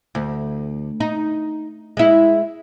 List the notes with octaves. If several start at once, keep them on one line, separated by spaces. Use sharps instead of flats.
D2
D#4
G#3 E4